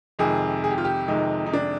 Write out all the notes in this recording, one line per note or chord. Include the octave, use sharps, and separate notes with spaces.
F2 C3 D#3 G#3 G#4
G#4
G4
F4
G4
F2 C3 D#3 G#3 D#4
D#4
D4